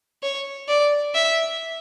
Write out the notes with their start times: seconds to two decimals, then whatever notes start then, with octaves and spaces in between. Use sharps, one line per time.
0.23 C#5
0.68 D5
1.15 E5